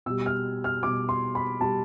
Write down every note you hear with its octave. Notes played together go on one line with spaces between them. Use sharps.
B2 G3 E6
F6
F6
B2 G3 D6
C6
B5
B2 G3 A5